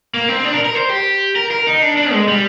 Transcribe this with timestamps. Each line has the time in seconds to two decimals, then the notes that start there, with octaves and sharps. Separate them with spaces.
0.14 A#3
0.29 C4
0.45 D4
0.54 A#4
0.65 A#4
0.75 C5
0.89 G4
1.36 A#4
1.51 A#4
1.67 D#4
1.82 D4
1.97 D4
2.12 G#3
2.28 G3